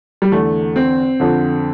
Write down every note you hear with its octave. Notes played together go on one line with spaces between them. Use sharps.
G3
E2 D3 A3
C4
F2 D3